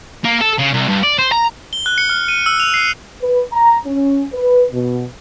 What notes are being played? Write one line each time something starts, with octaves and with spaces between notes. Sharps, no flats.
A#3
A4
C#3
C2
G2
D5
C5
A#5
G7
F#6
C#7
F6
D#7
E6
F7
C7
B4
A#5
C#4
B4
B2